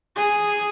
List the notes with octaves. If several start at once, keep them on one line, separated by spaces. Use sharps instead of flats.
G#4